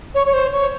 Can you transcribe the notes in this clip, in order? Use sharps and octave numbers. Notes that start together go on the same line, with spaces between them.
C#5
C#5
C5
C#5